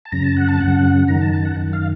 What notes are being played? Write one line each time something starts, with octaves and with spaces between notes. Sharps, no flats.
A5
F#2 C#3 A#5
A5
F#5
A5
F#2 C#3 F#5
F#2 D#3 A#5
A5
A5
F#5
F#2 D#3
F5